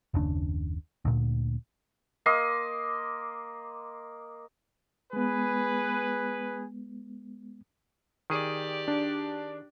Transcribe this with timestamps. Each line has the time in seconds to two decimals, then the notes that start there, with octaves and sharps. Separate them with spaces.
0.14 F#1 D#2 C#3 D4
1.05 D2 A#2
2.26 A#3 D#5 C6
5.13 G#3 B3 G#4 B4
8.30 D#3 G4 G#4 D5
8.88 D4